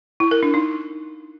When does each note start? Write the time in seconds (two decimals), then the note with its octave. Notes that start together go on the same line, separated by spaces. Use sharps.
0.20 E4
0.31 A#4
0.43 D4
0.54 D#4